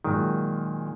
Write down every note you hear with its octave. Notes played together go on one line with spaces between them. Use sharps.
A#2 D#3 F#3 G#3